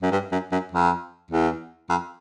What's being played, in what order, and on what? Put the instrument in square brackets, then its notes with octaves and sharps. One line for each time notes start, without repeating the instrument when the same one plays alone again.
[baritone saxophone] F#2
G2
F#2
F#2
F2
E2
F2